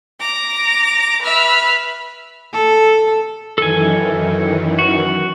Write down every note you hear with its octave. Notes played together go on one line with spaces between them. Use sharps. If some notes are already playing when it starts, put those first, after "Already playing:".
A#5 D6 A#6
B4 E5 F6
A4
F#2 D#3 E3 A4 G#5
F#4